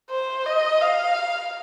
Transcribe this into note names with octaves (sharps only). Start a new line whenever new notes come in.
C5
D#5
F5